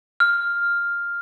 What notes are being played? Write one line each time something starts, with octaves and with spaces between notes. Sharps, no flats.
F6